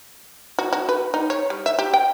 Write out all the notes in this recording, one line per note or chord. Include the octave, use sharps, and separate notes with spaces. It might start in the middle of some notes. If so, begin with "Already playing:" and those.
F#4
F#4
B4
D#4
C#5
G3
E5
G4
G5